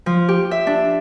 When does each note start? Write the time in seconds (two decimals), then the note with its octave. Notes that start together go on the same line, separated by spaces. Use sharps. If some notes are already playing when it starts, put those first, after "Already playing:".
0.06 F3
0.28 G4
0.51 E5
0.67 D4